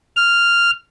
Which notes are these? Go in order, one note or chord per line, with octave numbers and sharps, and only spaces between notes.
F6